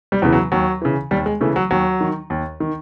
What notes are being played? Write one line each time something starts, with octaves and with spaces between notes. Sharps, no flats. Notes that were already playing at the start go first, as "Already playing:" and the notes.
G3
E2 C#3 E3
F#3
D#2 F#3
C#3 E3
D#2 G3
G#3
C#3 E3 A3
F#3
D#2 F#3
D#3
D#2
D#3